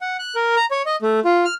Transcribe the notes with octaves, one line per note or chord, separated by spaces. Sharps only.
F#5
F#6
A#4
A#5
C#5
D#5
A3
F4
F6